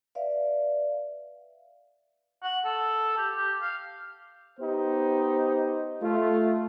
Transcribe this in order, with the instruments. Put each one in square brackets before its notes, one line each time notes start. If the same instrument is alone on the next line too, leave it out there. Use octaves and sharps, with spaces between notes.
[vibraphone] B4 D5 E5 F5
[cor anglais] F#5
A4
G4
G4
F5
[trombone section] B3 D#4 G4 C5
A3 F4